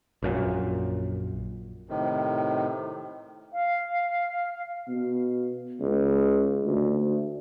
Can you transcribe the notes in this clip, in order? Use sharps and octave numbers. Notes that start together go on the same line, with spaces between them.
A#1 F#2 A#2
A2 C3 D#3
F5
B2
C#2
D2